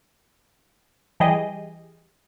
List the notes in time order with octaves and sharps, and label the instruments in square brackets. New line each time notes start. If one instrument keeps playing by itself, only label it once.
[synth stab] E3 G3 G4 G#4 D#5